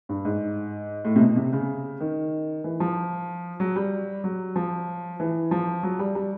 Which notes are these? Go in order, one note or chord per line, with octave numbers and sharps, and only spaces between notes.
G2
G#2
A2
C3
B2
C3
C#3
D#3
E3
F3
F#3
G3
F#3
F3
E3
F3
F#3
G3
G3